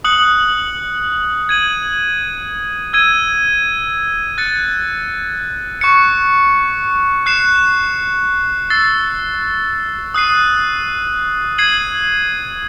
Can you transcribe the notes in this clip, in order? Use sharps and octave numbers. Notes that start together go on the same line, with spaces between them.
D#6 F#6 C#7 F#7
G#6 D#7 F#7
E6 G#6 D#7
F#6 A6 C#7
C#6 F#6 C#7
F#6 C7 E7
E6 A6 C7
D#6 F#6 C7 D#7
G#6 C7 D#7 F#7